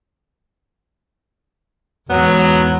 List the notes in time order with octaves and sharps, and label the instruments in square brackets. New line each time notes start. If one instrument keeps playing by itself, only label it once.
[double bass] E2 G#2 [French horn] F#3 [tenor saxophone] B3